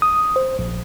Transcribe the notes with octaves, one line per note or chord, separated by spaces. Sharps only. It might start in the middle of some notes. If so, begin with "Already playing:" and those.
D#6
C5
A#1